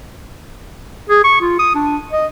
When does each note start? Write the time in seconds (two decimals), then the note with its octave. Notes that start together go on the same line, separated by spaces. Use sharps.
1.09 G#4
1.24 C#6
1.41 F4
1.59 D#6
1.75 D4
2.12 D#5